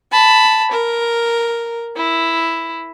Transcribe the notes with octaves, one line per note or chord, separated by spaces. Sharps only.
A5 B5
A#4
E4